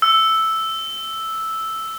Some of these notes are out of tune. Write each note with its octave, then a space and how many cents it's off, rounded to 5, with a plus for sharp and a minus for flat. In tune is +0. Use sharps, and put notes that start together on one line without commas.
E6 -5